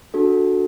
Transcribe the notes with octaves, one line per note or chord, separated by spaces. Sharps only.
D4 F#4 A4